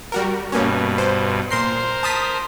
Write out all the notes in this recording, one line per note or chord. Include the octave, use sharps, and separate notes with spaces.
G3 F#4 A#4
G2 B2 A#3 C#4
C5
A#2 A#4 C5 C6 C7
A5 D#6 B6